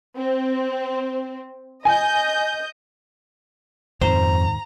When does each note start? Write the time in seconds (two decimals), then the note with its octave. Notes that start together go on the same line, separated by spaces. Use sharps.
0.17 C4
1.85 D#5 G#5 G6
4.02 D#1 F2 G#2 D#3 C5 A#5